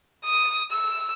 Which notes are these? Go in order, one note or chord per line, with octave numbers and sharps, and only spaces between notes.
D#6
E6